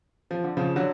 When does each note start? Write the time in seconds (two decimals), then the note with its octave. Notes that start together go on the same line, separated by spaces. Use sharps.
0.31 F3
0.44 D3
0.57 C#3 F3
0.76 D3 F#3